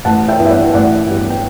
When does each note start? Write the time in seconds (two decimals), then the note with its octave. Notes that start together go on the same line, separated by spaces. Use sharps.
0.05 A1 F#5 A5
0.28 E5 G5
0.39 G2 E3 B3
0.46 E5
0.50 D5 F#5
0.73 A1 D5 F#5
1.09 G2 E3 B3
1.30 G5